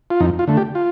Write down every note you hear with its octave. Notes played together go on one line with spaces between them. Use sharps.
F4
F2 D#4
F4
D3 A3
G4
F4